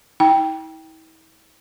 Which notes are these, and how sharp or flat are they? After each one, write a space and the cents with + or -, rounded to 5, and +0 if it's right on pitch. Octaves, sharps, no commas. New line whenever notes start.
E4 -45 G5 +0